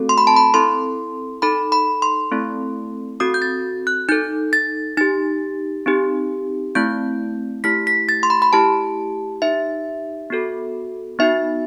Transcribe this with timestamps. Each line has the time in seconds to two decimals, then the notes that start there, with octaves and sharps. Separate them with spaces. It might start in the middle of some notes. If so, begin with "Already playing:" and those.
Already playing: A3 C4 F#4 A4
0.09 C6
0.18 B5
0.27 A5
0.36 B5
0.54 C4 E4 A4 C6
1.42 D#4 A4 B5
1.72 B5
2.02 C6
2.31 A3 C4 E4 A4
3.20 C4 F#4 A4 D#6
3.34 G6
3.42 A6
3.87 F#6
4.09 D#4 A4 G6
4.53 A6
4.97 D#4 G4 A6
5.86 C4 D#4 G4
6.75 A3 C4 E4 G6
7.64 A3 E4 G4 B6
7.87 B6
8.09 A6
8.23 C6
8.30 B5
8.42 B5
8.53 A3 E4 G4 A5
9.42 D#4 G4 E5
10.30 B3 F#4 A4
11.19 B3 D#4 F#4 E5